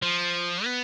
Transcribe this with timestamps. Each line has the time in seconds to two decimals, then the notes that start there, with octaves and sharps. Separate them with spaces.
0.02 F3
0.65 B3